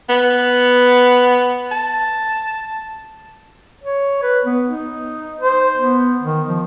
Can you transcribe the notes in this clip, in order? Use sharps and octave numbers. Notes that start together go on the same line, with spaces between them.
B3
A5
C#5
B4
B3
D#4
C5
B3
D#3
F3